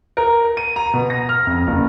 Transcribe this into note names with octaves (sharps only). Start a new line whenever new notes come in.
A#4
D#7
A#5
B2
A#6
F6
F2
F#1